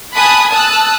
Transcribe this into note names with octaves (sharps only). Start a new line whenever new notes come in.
G#5 A5 B5 D#6 F#6
A5 D#6 E6 F#6